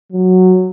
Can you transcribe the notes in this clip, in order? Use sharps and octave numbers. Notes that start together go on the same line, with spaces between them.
F#3